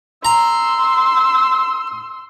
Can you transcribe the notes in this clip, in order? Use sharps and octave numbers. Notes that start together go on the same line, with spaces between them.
A#5 C6 E6